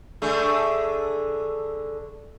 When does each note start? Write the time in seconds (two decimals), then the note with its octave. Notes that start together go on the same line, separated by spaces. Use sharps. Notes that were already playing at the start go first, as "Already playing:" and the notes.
0.22 D3 A3 G#4